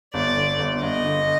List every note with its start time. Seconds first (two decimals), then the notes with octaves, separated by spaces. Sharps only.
0.14 G1 D5
0.37 D3
0.60 G1
0.83 G1 D#5
1.05 D3